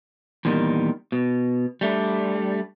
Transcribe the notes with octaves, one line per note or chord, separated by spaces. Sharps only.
E2 A#2 D#3 G3
B2
G3 A3 D4